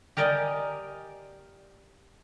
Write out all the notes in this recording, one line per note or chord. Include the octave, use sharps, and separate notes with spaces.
G4 A#4 D5 D#5 G#5